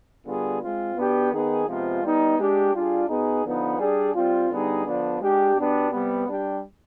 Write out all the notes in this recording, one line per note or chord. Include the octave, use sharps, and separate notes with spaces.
D3 G3 B3 F4 G#4
G#3 C4 F4
B2 B3 D4 G4
D#3 B3 D#4 G#4
C3 F3 G#3 B3 F4
G3 B3 D#4
G#3 D4 G4
G3 D4 F4 G#4
B2 B3 D#4 G#4
D3 F3 B3 D#4
G3 D4 G#4
G3 C4 F4
D3 G3 B3 D#4 G#4
D3 F3 B3 D4
G#3 D4 G4
B2 B3 D4 G4
C3 G3 B3
G3 D4 G4